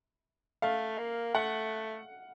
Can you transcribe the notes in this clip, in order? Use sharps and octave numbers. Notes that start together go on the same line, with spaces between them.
A3 F5
A#3
A3 F#5